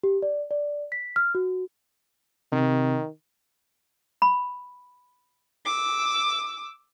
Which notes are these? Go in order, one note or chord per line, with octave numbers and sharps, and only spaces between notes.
G4
D5
D5
B6
F6
F#4
C3 D#3
B5
D6 E6